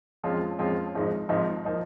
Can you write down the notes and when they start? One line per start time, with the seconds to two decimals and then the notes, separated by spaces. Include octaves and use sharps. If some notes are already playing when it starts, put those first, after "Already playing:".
0.23 F2 F3 G#3 C#4 F4
0.59 F2 F3 G#3 C#4 F4
0.95 G#1 G#2 F3 G#3 D#4
1.29 G#1 G#2 F3 G#3 D#4
1.65 F3 A#3 D#4